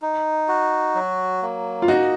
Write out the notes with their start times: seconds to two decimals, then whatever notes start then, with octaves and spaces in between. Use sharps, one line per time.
0.02 D#4
0.48 F#4
0.95 F#3
1.42 A#3
1.82 F4
1.88 D#4 F#4 D#5